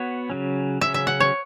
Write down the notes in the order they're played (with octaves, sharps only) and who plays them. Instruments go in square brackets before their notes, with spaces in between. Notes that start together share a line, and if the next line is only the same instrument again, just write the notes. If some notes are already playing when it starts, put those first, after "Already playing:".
Already playing: [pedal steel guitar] B3 F#4 C#5
C#3 F#3 C#4
[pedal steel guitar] C#3 F#3 C#4 [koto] E5
[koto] E5
F#5
C#5